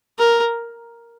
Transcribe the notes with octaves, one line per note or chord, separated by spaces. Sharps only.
A#4